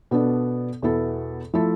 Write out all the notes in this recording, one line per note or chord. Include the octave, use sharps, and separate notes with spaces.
B2 B3 D4 A4 D5
E2 B2 B3 E4 A4
F3 A3 E4 A4